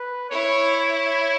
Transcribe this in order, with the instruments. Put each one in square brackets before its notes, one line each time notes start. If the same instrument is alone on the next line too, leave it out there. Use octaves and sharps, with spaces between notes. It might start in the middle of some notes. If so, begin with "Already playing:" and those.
Already playing: [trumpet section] B4
[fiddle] E4 [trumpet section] C#5
[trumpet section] C#5